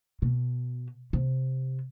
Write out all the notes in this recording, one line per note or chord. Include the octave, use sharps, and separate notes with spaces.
B2
C3